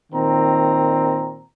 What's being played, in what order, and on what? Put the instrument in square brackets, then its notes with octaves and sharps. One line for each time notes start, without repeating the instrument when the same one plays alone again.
[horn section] A#2 D#3 C4 A#5